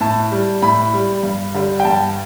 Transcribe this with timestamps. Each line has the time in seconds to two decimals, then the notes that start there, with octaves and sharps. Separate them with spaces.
0.01 A2 A5
0.31 G3
0.62 A2 B5
0.93 G3
1.23 G2
1.54 D3 G3
1.80 G5
1.85 G2 A5